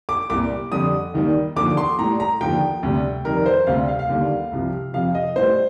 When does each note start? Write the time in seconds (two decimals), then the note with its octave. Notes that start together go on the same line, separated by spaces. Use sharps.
0.09 D6
0.30 C2 A#2 G3 D6
0.72 F2 D3 G3 D#6
1.14 D#2 D#3 G3
1.56 D#2 D3 F3 D6
1.77 C6
1.98 A2 G3 A#5
2.20 A#5
2.41 D#2 D3 F3 G5
2.83 D2 C3 G3
3.25 F2 D#3 G3 A#4
3.46 C5
3.67 D2 C3 G3 F5
3.88 F5
3.99 F5
4.09 D#2 D3 G3
4.51 C2 C3 F3
4.94 F2 C3 F3 F5
5.15 D#5
5.36 A2 G3 C5